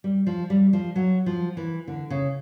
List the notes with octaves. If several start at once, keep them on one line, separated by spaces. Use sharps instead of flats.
G3
F3
G3
F3
F#3
F3
E3
D3
C#3